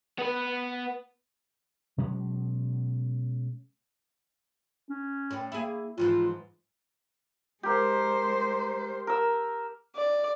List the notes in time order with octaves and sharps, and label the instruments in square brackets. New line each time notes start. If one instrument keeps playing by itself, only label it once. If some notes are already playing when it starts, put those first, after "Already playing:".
[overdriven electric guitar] B3 B4
[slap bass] B2 F#3 G#3 C#4
[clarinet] C#4
[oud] A2
[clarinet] A#3 [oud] E4 G#4
[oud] G#2 E3 F3 [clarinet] F4
[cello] G#3 C5 [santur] G4 A#4
[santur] A#4 E6
[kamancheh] D5